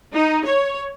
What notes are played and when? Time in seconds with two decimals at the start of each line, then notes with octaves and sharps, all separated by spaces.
0.14 D#4
0.46 C#5